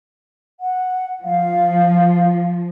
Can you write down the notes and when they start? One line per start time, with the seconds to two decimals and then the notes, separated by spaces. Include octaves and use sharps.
0.60 F#5
1.25 F3 F5